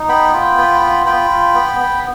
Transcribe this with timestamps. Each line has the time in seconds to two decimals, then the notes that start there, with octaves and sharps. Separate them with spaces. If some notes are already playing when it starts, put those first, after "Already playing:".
Already playing: D#4
0.08 B3 G5 B5
0.33 F4
0.58 B3
0.81 F4
1.06 F4 G5 B5
1.31 F4
1.55 B3
1.80 B3